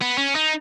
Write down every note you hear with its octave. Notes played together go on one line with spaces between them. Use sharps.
B3
C#4
D#4